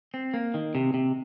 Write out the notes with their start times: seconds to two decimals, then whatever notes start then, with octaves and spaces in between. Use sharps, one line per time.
0.14 C4
0.34 A#3
0.54 D#3
0.75 C3
0.94 C3